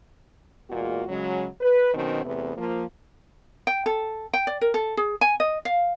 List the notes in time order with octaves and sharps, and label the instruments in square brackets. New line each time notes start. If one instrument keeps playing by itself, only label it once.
[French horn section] E2 A#2 G#3 A#3 F4 F#4
C#3 F#3 G#3
B4
B2 D#3 F#3 C4 C#4
E2 C3 A3 B3
F3 A#3 F4
[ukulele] G5
A4
G5
D5
A#4
A4
G#4
G#5
D#5
F5